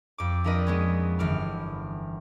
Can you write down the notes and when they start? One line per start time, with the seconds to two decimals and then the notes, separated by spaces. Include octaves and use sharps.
0.18 F2 D6
0.44 F3 D4 A#4 B4 D#5
0.67 G#3 B3 C#4
1.19 G1 E3 D6 F6